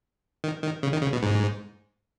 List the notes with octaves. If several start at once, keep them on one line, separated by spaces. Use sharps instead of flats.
D#3
D#3
C#3
D#3
C#3
B2
G#2